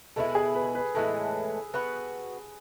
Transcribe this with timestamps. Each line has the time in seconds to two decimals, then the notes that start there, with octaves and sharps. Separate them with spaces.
0.16 B2 G#3 B3 E4 A4
0.35 G#4
0.55 B4
0.75 B4
0.95 A2 E3 G#3 B3 A4
1.74 B3 F#4 B4